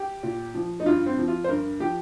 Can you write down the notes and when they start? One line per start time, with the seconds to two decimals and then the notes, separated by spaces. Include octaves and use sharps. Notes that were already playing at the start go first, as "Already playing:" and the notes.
Already playing: G4
0.23 A#2
0.54 F3
0.80 D#4
0.85 G2 F4
1.06 C4
1.18 F3
1.28 F4
1.44 C5
1.48 G2 A#4
1.80 F3 G4